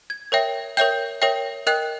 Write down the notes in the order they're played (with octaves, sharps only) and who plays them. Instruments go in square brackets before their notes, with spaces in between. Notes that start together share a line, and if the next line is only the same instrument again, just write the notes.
[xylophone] G#6
A#4 C#5 E5 G5
A#4 C#5 E5 G5 G6
A#4 C#5 E5 G5
A#4 D#5 G5 F#6